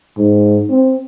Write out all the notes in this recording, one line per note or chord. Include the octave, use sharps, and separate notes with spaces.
G#2
C4